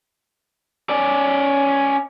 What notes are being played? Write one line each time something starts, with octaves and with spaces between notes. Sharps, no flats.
C#4 D5